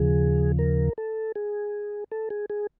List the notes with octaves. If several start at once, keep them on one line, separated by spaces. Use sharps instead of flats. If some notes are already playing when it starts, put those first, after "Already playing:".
Already playing: D#2 C#3 F3 G#4
A#4
A4
G#4
A4
G#4
G#4